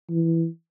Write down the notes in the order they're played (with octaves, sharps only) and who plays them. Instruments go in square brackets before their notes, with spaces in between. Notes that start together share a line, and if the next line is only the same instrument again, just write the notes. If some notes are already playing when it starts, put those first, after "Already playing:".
[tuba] E3